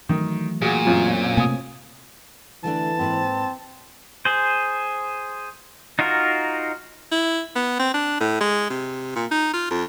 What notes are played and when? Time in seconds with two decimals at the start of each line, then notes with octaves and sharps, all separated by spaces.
0.09 D#3 E3 F#3 A3
0.62 A#2 F#4 G#4
0.86 F#2 C4 C#4 F4 G#4
1.37 C3 A3 A#3 G#5 D#6
2.64 D3 E3 A3 D4 A5
2.99 G#2 A#3 C4 B4
4.25 G#4 C5
5.99 D#4 F4 F#4 A#4
7.12 E4
7.56 B3
7.79 C4
7.94 D4
8.20 A2
8.40 G#3
8.70 C3
9.15 A#2
9.31 D#4
9.53 F4
9.70 F2